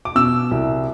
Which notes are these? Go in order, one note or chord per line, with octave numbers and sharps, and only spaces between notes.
D6
B2 E6
C2